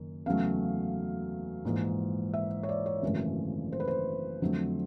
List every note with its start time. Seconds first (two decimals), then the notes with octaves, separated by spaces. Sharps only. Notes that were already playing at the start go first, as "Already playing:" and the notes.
Already playing: F#1 F#2 D#3
0.26 E2 C#3 F#3 A3 F5
1.65 A#1 G#2 E3 G#3
2.34 E5
2.63 C#5
2.69 D5
2.86 C#5
3.02 G#1 F#2 C#3 E3 A3
3.72 C5
3.80 B4
3.88 C5
4.42 F2 D3 F#3 A3